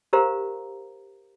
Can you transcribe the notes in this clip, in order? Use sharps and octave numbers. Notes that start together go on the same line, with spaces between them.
G4 A#4 C5 F5 A#5